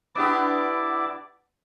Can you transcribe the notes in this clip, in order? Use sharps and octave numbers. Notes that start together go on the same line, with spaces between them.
B3 D4 E4 G4 D5 D6